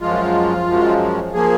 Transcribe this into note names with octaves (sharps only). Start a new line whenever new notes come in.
F#2 F3 G#3 F4
F#2 F3 G#3
F3 A#3 G#4